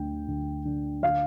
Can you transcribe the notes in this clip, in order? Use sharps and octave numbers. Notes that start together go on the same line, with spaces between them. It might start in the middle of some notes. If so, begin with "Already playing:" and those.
Already playing: D2 D3 G5
D2
D3
D3 F5